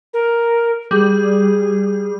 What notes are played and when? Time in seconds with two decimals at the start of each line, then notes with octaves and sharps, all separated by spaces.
0.13 A#4
0.91 G3 G#4